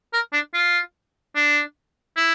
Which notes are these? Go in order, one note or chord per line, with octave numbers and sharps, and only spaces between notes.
A#4
D4
F4
D4
E4